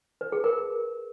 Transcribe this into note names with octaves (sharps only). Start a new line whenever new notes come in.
B4
G#4
A#4